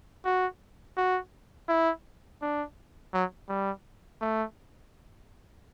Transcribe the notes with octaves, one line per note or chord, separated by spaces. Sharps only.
F#4
F#4
E4
D4
F#3
G3
A3